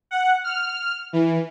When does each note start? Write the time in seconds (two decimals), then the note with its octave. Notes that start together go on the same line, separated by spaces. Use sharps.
0.11 F#5
0.44 F6
1.13 E3